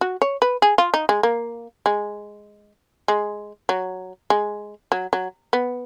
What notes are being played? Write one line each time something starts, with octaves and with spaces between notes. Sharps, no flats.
F#4
C#5
B4
G#4
F4
D#4
G#3
A#3
G#3
G#3
F#3
G#3
F#3
F#3
B3